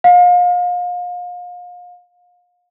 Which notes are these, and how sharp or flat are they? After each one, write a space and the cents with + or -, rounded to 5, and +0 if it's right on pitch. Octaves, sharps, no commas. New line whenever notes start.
F5 +35